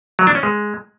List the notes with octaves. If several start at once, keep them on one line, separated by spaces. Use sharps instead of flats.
F#3
D4
C#4
G#3